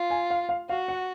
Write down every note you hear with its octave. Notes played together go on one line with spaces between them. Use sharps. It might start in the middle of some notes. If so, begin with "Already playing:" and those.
Already playing: F4
G#5
F5
F5
F#4 F5
F#5